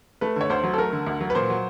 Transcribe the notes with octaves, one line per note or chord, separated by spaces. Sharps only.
A3 B4
D3 C#5
D2 C5
F#3
A4
A3 A#4
D3
D2
F#3
B4
A#2 C5
F#3